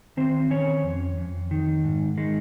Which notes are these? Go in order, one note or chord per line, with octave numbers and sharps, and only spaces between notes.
D#3 C4 C5
D#3 C#4 C#5
F2
F2
D#3
G#2
D#3 G#3